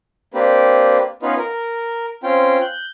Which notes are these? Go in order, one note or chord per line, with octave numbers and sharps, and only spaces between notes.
A#3 C4 D4 G4 B4
B3 C#4 D#4 F4 B4
A#4
C4 C#4 F4 G5
F#6 G6